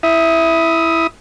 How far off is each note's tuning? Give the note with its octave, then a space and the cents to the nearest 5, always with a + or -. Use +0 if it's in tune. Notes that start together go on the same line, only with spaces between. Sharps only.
E4 +0 E5 +0 D#6 +15